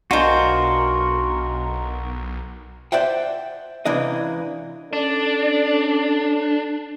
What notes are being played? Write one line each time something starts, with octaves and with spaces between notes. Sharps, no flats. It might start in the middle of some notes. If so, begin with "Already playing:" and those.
B1 D4 F4 F#4 A#4 C5 D#5 G#5
C5 D5 E5 F#5 G5
C#2 C3 E3 D4 D#5
C#4 D4 A4 D5